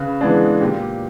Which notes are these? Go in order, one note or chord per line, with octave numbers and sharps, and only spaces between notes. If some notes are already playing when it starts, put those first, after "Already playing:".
Already playing: C#3 B4
E3 G#3 B3 D4 G#4
A#2 G4